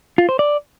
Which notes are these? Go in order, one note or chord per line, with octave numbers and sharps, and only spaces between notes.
F4
C5
D5